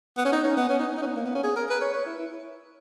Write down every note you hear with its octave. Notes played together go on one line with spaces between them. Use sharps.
B3
C#4
D#4
C#4
B3
C#4
D#4
D#4
C#4
B3
A#3
B3
C#4
G#4
A#4
B4
C#5
C#5
E4
E4